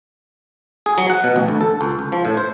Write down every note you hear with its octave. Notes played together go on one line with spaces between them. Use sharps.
G#4
F#3
F#5
B2
A1
D2
A4
C#2
C#2
F3
A2
C5